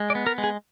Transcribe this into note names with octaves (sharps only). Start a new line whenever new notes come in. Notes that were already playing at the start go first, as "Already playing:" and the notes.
Already playing: G#3
D5
B3
A#4
G#3
G#4